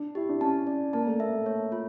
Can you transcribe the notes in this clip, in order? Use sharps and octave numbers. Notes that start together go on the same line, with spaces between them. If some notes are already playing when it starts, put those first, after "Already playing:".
Already playing: D4
E4 G4
D4
C#4 A5
D5
A#3 A5
A3
A#3 E5
A3
C#5
F4